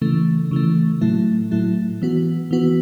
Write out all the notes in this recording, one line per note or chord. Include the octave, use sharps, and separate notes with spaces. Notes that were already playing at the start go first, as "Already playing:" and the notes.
C#3 E3 A3
C#3 E3 A3
A2 F#3 A3 E4
A2 F#3 A3 E4
E3 B3 F#4
E3 B3 F#4